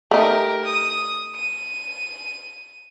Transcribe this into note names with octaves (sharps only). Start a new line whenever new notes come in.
A3 D#4 G4 A#4
D#6
D#7